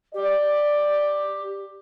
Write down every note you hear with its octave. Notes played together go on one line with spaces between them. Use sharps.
G4 D5